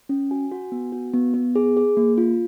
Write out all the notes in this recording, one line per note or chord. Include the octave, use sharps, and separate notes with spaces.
C#4
F#4 G#5
F#4
B3
F#4
B3
B3
G#4
G#4
A#3
F4